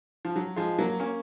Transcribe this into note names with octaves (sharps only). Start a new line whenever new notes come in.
F3
F#3
F3 G#3
F#3 A#3
A#3 C#4